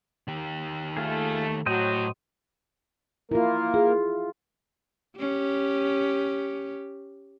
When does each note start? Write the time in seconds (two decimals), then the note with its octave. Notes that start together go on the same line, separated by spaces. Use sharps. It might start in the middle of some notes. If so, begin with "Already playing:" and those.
0.28 D#3 G4
0.97 A3 F4 G#4
1.66 A2 F#3 F#4 C5 D#5 G5
3.31 A#3 E4 F4 A#4
3.74 F4 G#4
5.18 C#4 G4